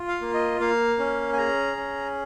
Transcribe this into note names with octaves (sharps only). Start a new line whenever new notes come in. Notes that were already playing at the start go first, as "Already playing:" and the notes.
Already playing: F4
F5
A#3
D#5
A#3 F5
C#4
G#5
G#4 A#5
C#4